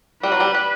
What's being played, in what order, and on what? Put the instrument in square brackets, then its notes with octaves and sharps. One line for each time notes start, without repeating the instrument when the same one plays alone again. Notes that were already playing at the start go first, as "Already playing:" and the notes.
[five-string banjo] G3 [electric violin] B4
[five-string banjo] F#3
G3
G3